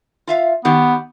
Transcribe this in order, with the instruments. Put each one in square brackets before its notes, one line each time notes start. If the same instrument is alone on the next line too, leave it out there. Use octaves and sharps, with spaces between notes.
[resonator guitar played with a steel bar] F4 E5 F5
[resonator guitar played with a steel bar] D#3 G4 [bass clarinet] B3